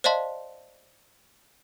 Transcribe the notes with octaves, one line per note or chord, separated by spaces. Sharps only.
C5 D5 D#5 F5 A5 C6